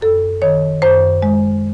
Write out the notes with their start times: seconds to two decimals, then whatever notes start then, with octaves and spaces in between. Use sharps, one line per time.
0.01 F#2 A4
0.42 D#3 C#5
0.82 F#2 C5
1.22 G#3